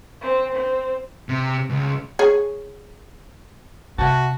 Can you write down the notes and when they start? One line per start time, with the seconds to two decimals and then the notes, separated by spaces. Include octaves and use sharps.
0.21 C4
0.55 C4
1.29 C3
1.70 C#2
2.19 G#4 C#5
3.98 C3 F#4 E5 F#5 A5